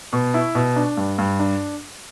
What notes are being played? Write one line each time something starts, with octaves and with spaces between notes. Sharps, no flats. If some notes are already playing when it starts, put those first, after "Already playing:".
B2
E4
B2
D4
G2
G2
D4